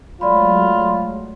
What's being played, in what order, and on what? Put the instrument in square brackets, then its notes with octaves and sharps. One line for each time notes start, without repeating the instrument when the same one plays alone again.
[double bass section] F#3 G#3 A3 [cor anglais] F4 [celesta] D5 B5